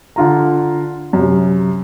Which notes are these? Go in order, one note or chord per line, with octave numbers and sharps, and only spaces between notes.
D3 F4 A#5
F#2 C3